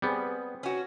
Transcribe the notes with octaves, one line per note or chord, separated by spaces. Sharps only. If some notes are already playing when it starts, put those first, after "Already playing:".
G3 B3 C4 G#4 B4
C#4 F#4